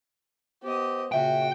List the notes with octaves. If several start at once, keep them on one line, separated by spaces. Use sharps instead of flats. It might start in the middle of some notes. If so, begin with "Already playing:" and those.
B3 G4 C5 D#5
A#2 C#3 F#4 E5 G5